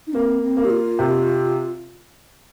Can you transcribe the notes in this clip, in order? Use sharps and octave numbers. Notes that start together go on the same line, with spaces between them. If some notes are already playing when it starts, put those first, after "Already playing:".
D#4
A#3 C4
C4
A#3
G4
F4
C3